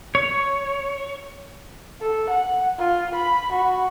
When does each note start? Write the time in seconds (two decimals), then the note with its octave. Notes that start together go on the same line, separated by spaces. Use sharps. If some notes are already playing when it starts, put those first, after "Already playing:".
0.15 C#5
2.01 A4
2.30 F#5
2.79 F4
3.15 B5
3.52 F#4